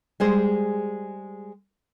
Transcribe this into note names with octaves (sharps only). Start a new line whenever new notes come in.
G3 G#3 G#4 C5